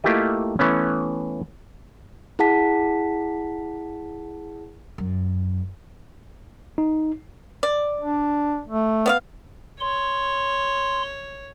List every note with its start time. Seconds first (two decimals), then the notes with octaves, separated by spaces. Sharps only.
0.04 A3 A#3 E4 F4 G4 D#5
0.59 E3 A3 B3 C#4
2.39 E4 G#4 F#5 A5 B6
4.98 F#2
6.78 D#4
7.63 D5
8.01 D4
8.68 A3
9.06 B3 D5 F5
9.80 C#5 C6